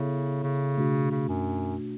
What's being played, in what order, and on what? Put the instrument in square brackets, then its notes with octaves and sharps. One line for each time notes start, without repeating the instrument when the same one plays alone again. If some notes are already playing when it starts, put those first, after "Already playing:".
Already playing: [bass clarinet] C#3 [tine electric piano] B3 E4 A4 C#5 E5
[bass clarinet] C#3
[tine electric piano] B2 A3 D4 F#4
[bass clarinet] C#3
F#2